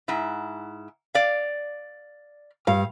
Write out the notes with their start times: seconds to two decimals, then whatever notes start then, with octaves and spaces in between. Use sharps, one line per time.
0.08 G#2 E4
1.15 D5 F5
2.67 G2 F5